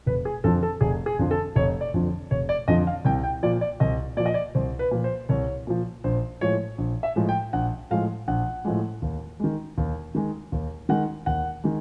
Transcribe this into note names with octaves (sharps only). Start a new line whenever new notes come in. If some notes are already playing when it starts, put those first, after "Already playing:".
F1 B4
G#4
F2 D3 F3 A4
A4
F1 G#4
G#4
F2 D3 F3
A4
F1 C#5
D5
F2 D3 F3
F1 C#5
D5
F2 D3 F3 D#5
F5
C2 G5
G5
A#2 F3 D5
D5
C2 D#5
A#2 F3 D5
D#5
D5
C2 C5
B4
A#2 F3
C5
C2 C#5
A#2 F3
A#1 C5
A2 F3 G#3 C#5
A#1
E5
A2 F3 G#3
G5
A#1 F#5
A2 F3 G#3 F5
A#1 F#5
A2 F3 G#3
D#2
D#3 G#3
D#2
D#3 G#3
D#2
D#3 G#3 F#5
D#2 F#5
D#3 G#3